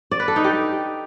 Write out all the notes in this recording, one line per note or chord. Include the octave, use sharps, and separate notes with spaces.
D5
B4
A4
D#4
G4